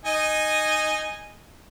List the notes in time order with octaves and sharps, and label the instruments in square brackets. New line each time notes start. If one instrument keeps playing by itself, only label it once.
[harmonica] D#4 D#5 G#5